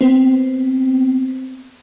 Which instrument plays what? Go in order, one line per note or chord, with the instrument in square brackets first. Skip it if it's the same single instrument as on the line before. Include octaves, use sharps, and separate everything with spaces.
[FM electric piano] B3 C4